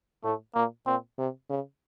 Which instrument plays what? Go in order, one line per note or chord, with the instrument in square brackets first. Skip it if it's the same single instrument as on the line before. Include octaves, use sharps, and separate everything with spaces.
[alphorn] A2 [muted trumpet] A3
[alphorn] A#2 [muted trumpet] A#3
[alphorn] A#2 [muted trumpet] C4
[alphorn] C3
C#3